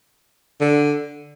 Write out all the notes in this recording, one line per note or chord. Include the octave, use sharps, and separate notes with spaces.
D3